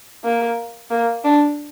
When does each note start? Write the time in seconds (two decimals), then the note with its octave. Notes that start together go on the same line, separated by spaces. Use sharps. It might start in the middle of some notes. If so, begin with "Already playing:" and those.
0.24 A#3
0.90 A#3
1.24 D4